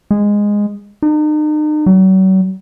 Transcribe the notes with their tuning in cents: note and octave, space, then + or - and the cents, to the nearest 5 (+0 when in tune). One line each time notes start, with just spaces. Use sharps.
G#3 -10
D#4 -40
F#3 +40